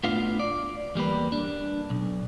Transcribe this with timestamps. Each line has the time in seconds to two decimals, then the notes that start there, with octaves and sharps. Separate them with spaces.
0.04 A2 B3 D4 F4 F5
0.40 D5
0.95 E2 G3 A#3 B4
1.32 D4
1.90 B1